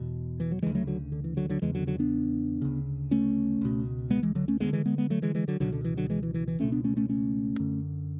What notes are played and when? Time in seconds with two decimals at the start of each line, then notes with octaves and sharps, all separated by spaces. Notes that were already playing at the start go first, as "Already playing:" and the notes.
Already playing: E2 B2
0.40 E3
0.51 F#3
0.62 D2 C#3 E3 G#3
0.75 F#3 A3
0.87 D3 F#3
1.12 D3
1.24 E3
1.37 D3 F#3
1.49 D3 F#3
1.62 E2 C#3 E3 G#3
1.75 D3 F#3
1.87 D3 F#3
1.99 B3 D4
2.61 D2 C#3
3.11 A3 C#4
3.61 C#2 B2
4.10 G#3 B3
4.23 E3 G#3
4.35 D3 F#3
4.48 A3 C#4
4.60 D2 D3 G#3 B3
4.73 E3 G#3
4.86 G#3 B3
4.98 G#3 B3
5.10 F#3 A3
5.22 E3 G#3
5.35 E3 G#3
5.48 D3 F#3
5.60 C#2 B2 D3 F#3
5.72 D3
5.84 E3
5.97 D3 F#3
6.10 E3 G#3
6.23 E3
6.34 E3
6.48 E3
6.59 C#2 B2 A3 C#4
6.72 B3 D4
6.84 A3 C#4
6.97 A3 C#4
7.09 A3 C#4
7.59 F#2 D3